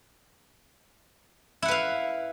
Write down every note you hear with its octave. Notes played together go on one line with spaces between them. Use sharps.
E4 B4 F5 F#5